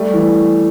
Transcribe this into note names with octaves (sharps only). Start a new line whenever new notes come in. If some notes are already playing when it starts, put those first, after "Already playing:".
Already playing: G3 A3
E3